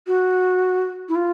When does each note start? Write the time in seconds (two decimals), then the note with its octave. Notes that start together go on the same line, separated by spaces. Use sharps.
0.07 F#4
1.09 E4
1.15 F4